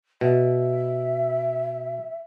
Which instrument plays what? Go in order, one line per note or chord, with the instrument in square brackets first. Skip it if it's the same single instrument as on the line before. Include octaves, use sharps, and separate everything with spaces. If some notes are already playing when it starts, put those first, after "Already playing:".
[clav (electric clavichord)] B2 [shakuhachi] E5